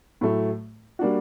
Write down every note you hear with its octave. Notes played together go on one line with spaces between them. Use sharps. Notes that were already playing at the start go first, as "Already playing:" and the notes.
A2 F#3 A3
G3 A#3 D4 F#4